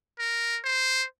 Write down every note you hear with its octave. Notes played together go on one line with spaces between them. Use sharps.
A#4
C5